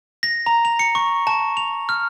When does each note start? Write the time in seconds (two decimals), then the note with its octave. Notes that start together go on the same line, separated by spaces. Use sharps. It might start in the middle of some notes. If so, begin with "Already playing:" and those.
0.23 A#6
0.46 A#5
0.65 F7
0.79 C#7
0.95 C#6
1.27 A5
1.57 F7
1.89 F6